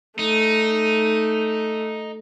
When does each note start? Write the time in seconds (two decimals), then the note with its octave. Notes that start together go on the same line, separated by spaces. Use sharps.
0.19 A3 D#4